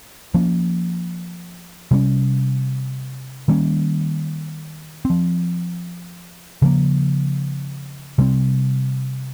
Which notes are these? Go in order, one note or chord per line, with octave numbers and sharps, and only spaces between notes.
F3 A#3 C#4
C3 G3 A#3 C#4
D#3 G3 A#3 C#4
F3 C4
C#3 F3 A#3
C3 G3 C4